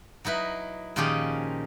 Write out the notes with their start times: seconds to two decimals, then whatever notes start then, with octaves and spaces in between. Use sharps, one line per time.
0.25 F#3 D#4 E4 B4
0.96 A#2 D#3 F3 C#4 G4 G#4